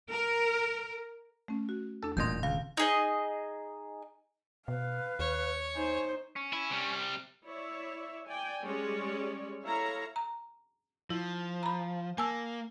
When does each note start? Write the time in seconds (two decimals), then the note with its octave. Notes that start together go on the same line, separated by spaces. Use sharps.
0.12 A#4
1.48 A3 C#4
1.69 F#4
2.03 E2 D4 A4
2.17 D#1 A1 A#2 D#5 C6 G6
2.43 C#2 D#3 F5
2.77 D#4 G#4 D#5
4.68 B2 B4 F5
5.19 D#2 C#5
5.76 D#4 C5 G#5
6.36 C#4
6.53 E4
6.70 C3 G3
7.44 E4 C#5 D5 E5
8.26 D5 G5 G#5
8.62 G3 G#3 C#4 C#5 D5
9.66 E4 A4 C#5 E5 F5 A#5
10.16 A#5
11.10 F3 E4
11.63 A#5 B5
12.18 A#3 G#5 A5 E6